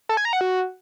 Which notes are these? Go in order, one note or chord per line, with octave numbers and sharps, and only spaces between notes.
A4
G#5
A#5
F#5
F#4